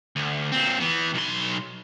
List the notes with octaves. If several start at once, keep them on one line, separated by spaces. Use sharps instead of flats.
D2
A#2 C4
E3 B3
B1 C6